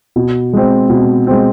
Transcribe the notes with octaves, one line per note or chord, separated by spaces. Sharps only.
B2
G#3 C4
B2
G#3 C4